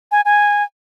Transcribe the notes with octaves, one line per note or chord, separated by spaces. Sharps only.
G#5
G#5